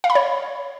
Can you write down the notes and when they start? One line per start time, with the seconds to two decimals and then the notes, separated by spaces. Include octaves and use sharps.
0.04 F5
0.10 B5
0.15 C#5